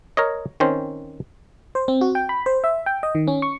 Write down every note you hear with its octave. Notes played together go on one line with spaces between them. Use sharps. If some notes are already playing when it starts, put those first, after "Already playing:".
A#4 C#5 D#5
D#3 C4 C#4 C5
C5
C4
F#4
G5
B5
C5
E5
G5
D#5
D#3
C#4
C#6